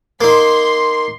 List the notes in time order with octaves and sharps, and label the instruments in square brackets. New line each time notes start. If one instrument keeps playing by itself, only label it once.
[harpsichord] A#3 D#4 [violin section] C6